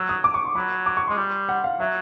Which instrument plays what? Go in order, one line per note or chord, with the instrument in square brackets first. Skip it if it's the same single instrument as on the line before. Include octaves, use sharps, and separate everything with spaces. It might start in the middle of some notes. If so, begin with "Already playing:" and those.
Already playing: [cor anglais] F#3 [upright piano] E6
[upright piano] D#6
D6
C#6
C6
[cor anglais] F#3 [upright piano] B5
[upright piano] D6
C#6
[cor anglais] G#3 [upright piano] C6
[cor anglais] G3
[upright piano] F#5
F5
[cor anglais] F#3 [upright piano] E5